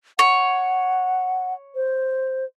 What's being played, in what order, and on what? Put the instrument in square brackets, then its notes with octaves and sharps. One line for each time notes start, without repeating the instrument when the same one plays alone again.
[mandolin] C#5 [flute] F#5
[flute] C5